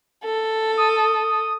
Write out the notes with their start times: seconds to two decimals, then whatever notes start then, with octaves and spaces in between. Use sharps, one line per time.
0.24 A4
0.77 D#6